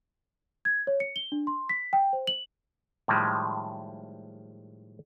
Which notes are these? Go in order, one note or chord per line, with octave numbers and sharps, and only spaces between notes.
G#6
C#5
C#7
G7
D4
C6
B6
G5
C5
F#7
A2 D#3 F3 G3 G#3